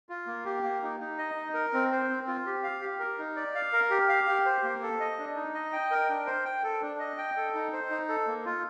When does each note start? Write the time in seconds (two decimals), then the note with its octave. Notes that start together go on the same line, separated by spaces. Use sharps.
0.09 F4
0.27 A#3
0.45 G4
0.63 A#3
0.82 D#4
1.00 D#4
1.18 D#5
1.36 D#4
1.54 A#4
1.73 C4
1.91 C5
2.09 C4
2.27 F4
2.46 G4
2.63 F5
2.81 G4
3.00 A#4
3.18 D#4
3.36 D5
3.55 F5
3.73 A#4
3.91 G4
4.09 F5
4.28 G4
4.45 C5
4.63 A#3
4.82 A4
5.00 D#5
5.19 D4
5.36 D#4
5.54 D#5
5.73 G5
5.91 A#4
6.10 D4
6.26 C5
6.45 G5
6.64 A4
6.82 D4
6.99 D#5
7.18 G5
7.37 A4
7.55 D#4
7.73 C5
7.90 D#4
8.09 A4
8.27 A#3
8.46 F4